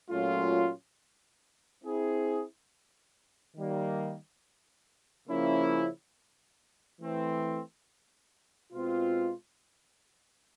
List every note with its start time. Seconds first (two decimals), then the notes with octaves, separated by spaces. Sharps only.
0.10 A#2 F#3 A3 C#4 F4
1.83 C4 E4 G#4
3.55 D#3 G3 A#3
5.28 C#3 F3 A#3 C#4 E4
7.00 E3 A3 C4
8.73 B2 G#3 C4 F4